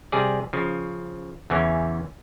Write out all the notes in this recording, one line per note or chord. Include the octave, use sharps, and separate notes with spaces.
C3 G3 G#4 D5
C#3 F3
E2 C#3 E3 C#4